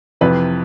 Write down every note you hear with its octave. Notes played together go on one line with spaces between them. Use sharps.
F2 C3 E3 B4